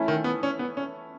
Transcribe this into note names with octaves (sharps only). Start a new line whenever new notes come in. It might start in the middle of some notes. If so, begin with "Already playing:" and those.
Already playing: E3 A3 C#4 E4 A4
D#3
B3
C#4
B3
C#4